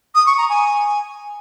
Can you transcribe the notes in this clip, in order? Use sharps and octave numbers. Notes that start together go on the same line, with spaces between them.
D#6
C#6
A#5
G#5